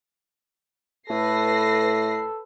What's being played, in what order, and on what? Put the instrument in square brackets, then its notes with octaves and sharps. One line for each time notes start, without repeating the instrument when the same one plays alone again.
[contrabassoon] A2 [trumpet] A4 [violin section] B4 A#6 C7